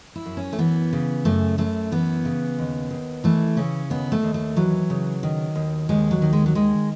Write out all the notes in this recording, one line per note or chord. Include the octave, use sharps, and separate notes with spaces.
E4
F#2
C#4
A3
E3 B3
C#3
F#2 A3
F#2 A3
E3 B3
C#3
D#2
D#2
E3 A3
C#3 C#4
D#2 B3
A3
D#2
A3
E3 F#3
C#3
D#3
D#2
D#2 G#3
F#3
D#3
G#3
F#3
D#3 G#3